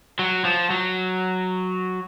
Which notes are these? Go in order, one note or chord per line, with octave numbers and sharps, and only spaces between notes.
F#3
F3
F#3